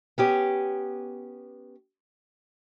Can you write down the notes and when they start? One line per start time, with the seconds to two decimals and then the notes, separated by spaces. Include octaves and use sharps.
0.18 B3 C#4 G4